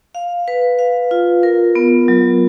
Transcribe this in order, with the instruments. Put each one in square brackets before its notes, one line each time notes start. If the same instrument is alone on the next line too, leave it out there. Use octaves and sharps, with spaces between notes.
[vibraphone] F5
B4
F5
F4
A#4
B3
F#3